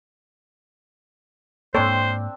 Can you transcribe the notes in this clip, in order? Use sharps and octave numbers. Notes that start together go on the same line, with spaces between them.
G#2 A#3 C4 D4 A4 C5 C#5